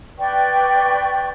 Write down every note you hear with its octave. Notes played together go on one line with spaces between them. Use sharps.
B4 D5 G5 C#6